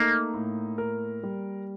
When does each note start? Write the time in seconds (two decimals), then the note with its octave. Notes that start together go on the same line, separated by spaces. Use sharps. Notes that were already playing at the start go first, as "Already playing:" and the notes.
Already playing: A3 A#3 D#4
0.34 A2
0.78 A#4
1.23 G3